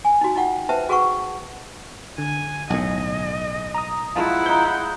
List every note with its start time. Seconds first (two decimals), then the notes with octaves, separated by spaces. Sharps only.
0.05 G#5
0.21 D#4 F#4
0.36 D#4 F4 F#5 G5
0.69 B4 C5 E5 G5 A5
0.89 F#4 G#4 A#4 B4 F#5 C#6
2.18 D3 G#5
2.70 B1 A2 D#5 G#5
3.74 A#5 D#6
4.15 F3 G#3 E4 F4 F#5
4.46 D#4 C5 G6